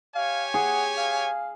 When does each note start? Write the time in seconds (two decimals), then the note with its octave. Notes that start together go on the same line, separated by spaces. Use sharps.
0.15 G4 C#5 F5 G#5
0.54 G#4 F#5
0.97 F5